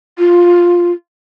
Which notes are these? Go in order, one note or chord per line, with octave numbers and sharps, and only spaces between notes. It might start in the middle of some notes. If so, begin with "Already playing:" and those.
F4